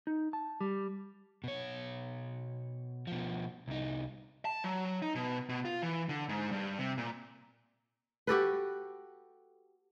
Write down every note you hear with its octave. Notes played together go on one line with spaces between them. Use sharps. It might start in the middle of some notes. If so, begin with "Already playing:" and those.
D#4
A5
G3
B2 C#5
B2 F3
C2 D#4
A5
F#3
D#4
B2
B2
F4
E3
D3
G#2
G2
C3
A#2
F#4 G4 A4 B4